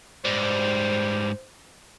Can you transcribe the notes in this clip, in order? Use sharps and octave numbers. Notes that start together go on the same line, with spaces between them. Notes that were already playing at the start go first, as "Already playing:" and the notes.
G#2 G3 C5